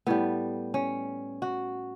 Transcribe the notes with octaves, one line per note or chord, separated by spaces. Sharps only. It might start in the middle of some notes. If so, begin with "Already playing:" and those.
A2 G3 B3
C#4
F#4